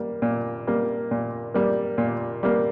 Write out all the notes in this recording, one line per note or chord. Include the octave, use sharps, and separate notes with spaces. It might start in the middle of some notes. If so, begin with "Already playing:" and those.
Already playing: G3 A#3
A#2
G3 A#3
A#2
G3 A#3
A#2
G3 A#3